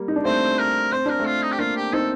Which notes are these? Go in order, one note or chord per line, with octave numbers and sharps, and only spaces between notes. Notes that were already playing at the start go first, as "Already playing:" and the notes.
Already playing: G3 A#3
D#4
D4
A3 C4 C5
A#4
C4 C5
D4 A#4
A3 C4
F4
D#4
G4
A#3 D4 F4
G4
C4 D#4 A4